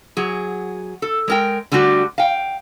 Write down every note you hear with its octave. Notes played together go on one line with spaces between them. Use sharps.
F#3 G#4
A4
G#3 A#4 G5
D3 G3 A3 F#4 G4
F5 G5